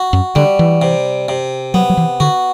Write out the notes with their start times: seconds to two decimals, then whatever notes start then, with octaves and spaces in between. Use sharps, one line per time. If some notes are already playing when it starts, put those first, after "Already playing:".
Already playing: F#4
0.13 F#2
0.35 D3 G3
0.59 E3
0.82 C3
1.29 C3
1.74 F#3 B3
1.90 F#3
1.97 E3
2.20 D3 F#4